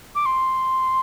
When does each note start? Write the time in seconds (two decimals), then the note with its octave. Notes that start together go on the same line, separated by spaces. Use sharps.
0.15 D6
0.26 C6